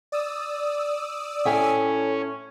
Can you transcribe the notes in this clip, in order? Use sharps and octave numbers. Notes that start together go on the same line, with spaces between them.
D5 D#6 E6
A2 C#4 E5 G5 G#5